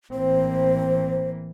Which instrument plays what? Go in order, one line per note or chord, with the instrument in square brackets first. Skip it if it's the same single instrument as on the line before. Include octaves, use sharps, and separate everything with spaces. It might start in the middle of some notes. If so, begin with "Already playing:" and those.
[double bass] A1 C4 [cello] E3 A#3 [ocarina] C5